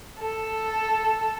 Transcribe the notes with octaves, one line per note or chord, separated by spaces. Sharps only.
A4